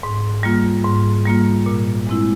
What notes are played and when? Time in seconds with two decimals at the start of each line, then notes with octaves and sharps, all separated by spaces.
0.03 G#2
0.43 G3 A#3 F4
0.85 G#2
1.25 G3 A#3 F4
1.66 A#2
2.07 G#3 C4 E4